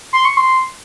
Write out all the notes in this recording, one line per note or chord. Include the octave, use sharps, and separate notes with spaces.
C6
C#6
C6